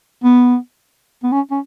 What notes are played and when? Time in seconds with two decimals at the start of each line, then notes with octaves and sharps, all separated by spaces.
0.24 B3
1.23 B3
1.32 C#4
1.51 C#4